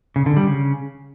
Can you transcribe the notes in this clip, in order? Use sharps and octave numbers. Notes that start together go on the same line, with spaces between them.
C#3
D3
G3
C#3